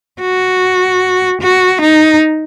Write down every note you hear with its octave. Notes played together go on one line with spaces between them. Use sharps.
F#4
F#4
D#4